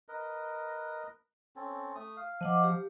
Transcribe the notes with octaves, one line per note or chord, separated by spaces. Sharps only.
A#4 B4 D#5
C4 C#4 A4
A3 D#6
F5
F3 D#5 F#5 D6
G4